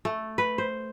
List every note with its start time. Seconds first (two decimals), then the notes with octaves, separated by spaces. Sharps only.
0.05 A3
0.38 B4
0.58 C5